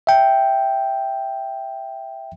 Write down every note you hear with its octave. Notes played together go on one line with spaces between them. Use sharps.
E5 G5